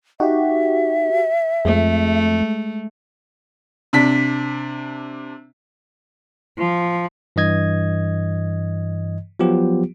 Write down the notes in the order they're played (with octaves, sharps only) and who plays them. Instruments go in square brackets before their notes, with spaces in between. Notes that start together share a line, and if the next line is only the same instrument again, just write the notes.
[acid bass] D#4 [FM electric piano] F#4 G4 [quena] E5
[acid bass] F2 [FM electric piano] G#3 [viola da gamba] A3
[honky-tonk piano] C3 D4 B6
[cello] F3
[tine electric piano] G2 E3 D#5 G#6
F3 F#3 B3 F4 G4